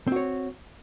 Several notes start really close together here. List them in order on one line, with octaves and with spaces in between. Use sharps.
C4 F#4 C#5